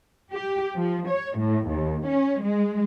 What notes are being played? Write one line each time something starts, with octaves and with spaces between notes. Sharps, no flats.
G4
F3
C#5
A2
D#2
C#4
G#3